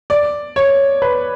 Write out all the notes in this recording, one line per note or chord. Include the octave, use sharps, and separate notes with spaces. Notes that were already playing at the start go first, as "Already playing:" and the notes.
D5
C#5
B4